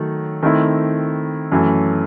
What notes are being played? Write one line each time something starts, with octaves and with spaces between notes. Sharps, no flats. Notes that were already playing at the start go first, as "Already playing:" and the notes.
Already playing: D#3 F#3 A3
D#3 A3 C4 E4
F#2 E3 A3